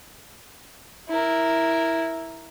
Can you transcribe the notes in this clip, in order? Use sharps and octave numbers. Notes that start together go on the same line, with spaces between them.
E4 A#4